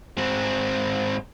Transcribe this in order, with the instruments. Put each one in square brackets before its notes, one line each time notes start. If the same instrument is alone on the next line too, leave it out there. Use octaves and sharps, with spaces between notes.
[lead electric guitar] G#2 C4